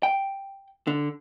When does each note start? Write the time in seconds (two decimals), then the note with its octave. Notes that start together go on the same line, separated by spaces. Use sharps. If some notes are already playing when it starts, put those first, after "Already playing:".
0.03 G5
0.87 D3